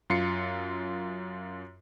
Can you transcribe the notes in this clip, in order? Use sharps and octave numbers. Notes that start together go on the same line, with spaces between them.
F#2 F4 C7 C#7